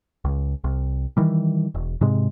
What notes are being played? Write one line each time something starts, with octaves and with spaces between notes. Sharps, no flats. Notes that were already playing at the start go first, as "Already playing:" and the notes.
C#2
C2
D#3 E3 G3
E1
G#2 C3 G#3